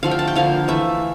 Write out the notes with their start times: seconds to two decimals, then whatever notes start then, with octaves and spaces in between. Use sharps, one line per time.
0.03 D3 F3 A3 F5
0.11 G5
0.19 A5
0.27 G5
0.36 D3 F3 A#3 F5
0.68 E3 A3 E5